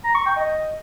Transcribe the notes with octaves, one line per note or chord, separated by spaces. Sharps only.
A#5
C#6
G5
D#5